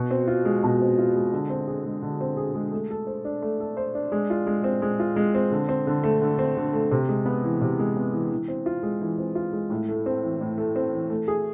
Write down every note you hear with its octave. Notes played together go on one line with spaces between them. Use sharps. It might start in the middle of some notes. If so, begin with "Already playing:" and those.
Already playing: B2
C4
F4
G#3
B2
C4
F4
G#3
D3
C4
G#4
G#3
D3
C4
G#4
G#3
A3
A4
C5
D4
A3
A4
C5
D4
G#3
F4
G#3
C4
G#3
F4
G#3
C4
D3
C4
D3
A3
D3
C4
D3
A3
C3
G#3
B3
E3
C3
G#3
B3
E3
E3
C4
F4
G#3
E3
C4
F4
G#3
A2
A3
C4
E3
A2
A3
C4
E3
A3
G#4